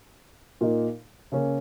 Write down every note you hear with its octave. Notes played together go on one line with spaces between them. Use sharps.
A#2 A#3 D#4
C#3 A#3 C#4